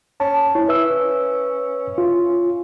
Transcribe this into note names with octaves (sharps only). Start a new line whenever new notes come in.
C#4 A5
C#4 E4
B4 E5 E6
F4